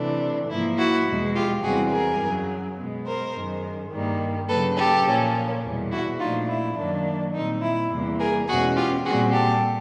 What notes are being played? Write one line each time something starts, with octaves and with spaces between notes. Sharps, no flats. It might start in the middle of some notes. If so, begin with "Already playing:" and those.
Already playing: C3 E3 A3 D4
G#2 F3 A#3 E4
E4 F#4
E2 B2 G#3
F4 G4
E2 C3 E3 G3 C4 F#4 G#4
G#4 A#4
F#2 C#3 F#3
B2 G#3 B3
A#4 C5
F#2 D#3 G#3
G2 D#3 G3 A#3
C#3 F#3 A#3 A4 B4
G4 A4
A#2 F3 A#3 C#4
E2 B2 G3
E4 F#4
A#2 F3 A3 D4 D#4 F4
E4
F#2 D#3 F#3 A#3 D4
A#2 G3 C4 D#4
E4
E2 C3 E3 G3 A#3
G#4 A#4
E2 B2 G#3 C#4 F#4 G#4
F4 G4
A#2 G3 C4 F#4 G#4
G4 A4